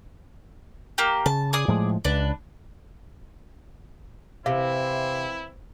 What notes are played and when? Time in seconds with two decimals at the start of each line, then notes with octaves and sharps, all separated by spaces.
0.98 A#3 G4
1.26 C#3 A5
1.53 G#4 D5 D#6
1.68 A2 F3 G#3
2.05 C#2 D4 B4
4.46 C3 E3 C4 E4 C5 F5